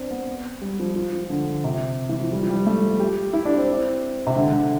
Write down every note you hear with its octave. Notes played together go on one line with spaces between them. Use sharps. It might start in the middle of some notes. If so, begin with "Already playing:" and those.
Already playing: C4 D4
B3
G3
F3
F3
F3
D3
C3
E3
F3
G3
F3
G3
A3
G4
E4
D4
C4
C3
D3
D3